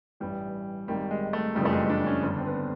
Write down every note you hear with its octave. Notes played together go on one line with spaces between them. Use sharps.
A1 G2 E3 G3
G#1 G#2 D#3 G3
G#3
A3
F#1 F2 C#3 E3 G3
A3
G#3
D4
C#4
G1 G2 D3
C4
B3